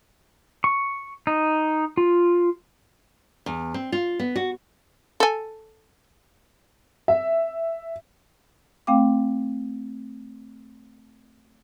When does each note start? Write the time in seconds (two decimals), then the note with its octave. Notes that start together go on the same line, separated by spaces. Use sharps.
0.64 C#6
1.27 D#4
1.97 F4
3.46 E2
3.74 C4
3.92 F4
4.19 B3
4.36 F#4
5.20 A4 G#5
7.08 E5
8.87 A3 C4 F5 G5 D6